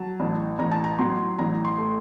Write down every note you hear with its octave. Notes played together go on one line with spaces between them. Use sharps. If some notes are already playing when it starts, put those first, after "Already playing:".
Already playing: F#3 A5
A1
A1 A#5
A5
A#5
F#3 C6
A1 A#5
C6
A3